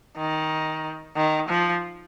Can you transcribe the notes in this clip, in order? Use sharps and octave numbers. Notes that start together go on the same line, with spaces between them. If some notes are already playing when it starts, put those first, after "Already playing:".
D#3
D#3
F3